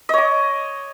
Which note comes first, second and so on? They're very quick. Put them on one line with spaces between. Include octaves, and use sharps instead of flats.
D#5 C#5 D6